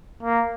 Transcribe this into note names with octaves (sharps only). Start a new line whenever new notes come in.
A#3